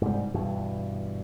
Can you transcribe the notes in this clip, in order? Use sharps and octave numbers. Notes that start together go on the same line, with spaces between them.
G#2 C3 G3
G2 B2 E3